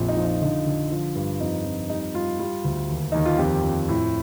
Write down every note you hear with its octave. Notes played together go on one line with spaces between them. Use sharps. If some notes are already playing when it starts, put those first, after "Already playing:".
Already playing: A#1 F2
D#4
F3
D#4
D3 D#4
D3
F3
G2
F2 D#4
F2
G3 D#4
G3 F4
G3 F4
D2
D#2
D#2 D#4
F4
F2 G4
F2
A2